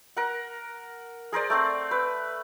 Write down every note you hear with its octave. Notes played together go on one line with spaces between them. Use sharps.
A#4 F#5
G#4 A#4 C5 D5
A3 C4 D5
B4